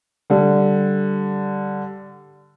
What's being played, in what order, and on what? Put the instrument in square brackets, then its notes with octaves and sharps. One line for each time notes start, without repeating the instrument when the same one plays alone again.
[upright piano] D3 G3